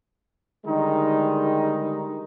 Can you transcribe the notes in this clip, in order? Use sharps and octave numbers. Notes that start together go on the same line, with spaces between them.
D3 D#3 G3 G#3 D#4